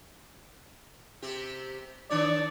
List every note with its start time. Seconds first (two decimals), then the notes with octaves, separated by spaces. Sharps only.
1.22 C3 C4 G4
2.10 D#3 D4 C#5 D5